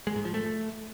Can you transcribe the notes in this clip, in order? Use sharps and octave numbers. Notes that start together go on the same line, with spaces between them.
G#3
G#2
F3
A3